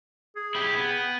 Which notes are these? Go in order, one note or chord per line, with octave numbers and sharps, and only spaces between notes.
G#4
E4 G4
B3
G5